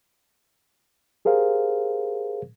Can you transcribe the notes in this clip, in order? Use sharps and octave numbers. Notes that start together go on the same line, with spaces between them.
G4 G#4 A#4 C5 F5